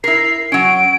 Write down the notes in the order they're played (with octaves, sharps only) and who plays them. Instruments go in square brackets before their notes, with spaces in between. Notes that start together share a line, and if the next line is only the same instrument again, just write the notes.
[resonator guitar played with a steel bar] E4 A#4 [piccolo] C7
[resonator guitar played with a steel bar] F#3 C#4 [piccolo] D7